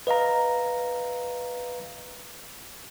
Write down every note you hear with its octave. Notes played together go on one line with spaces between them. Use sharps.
B4 D#5 F5 A#5